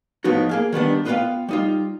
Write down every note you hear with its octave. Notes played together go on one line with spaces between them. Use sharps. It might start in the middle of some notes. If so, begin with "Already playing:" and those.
A2 F3 B3 D#4 F#4
A#3 G#4 F5
D#3 G3 B3 D4
B3 F4 B4 C5 F5 G5
G3 D#4 F4